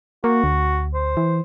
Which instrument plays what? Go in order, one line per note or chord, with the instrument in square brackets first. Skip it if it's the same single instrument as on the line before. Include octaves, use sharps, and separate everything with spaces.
[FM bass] A#3 [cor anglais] F#4
[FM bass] D2
[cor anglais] C5
[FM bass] E3